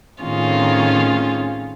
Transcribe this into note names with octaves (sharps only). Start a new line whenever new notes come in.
A2 D#3 C4 C#4 F4 G#4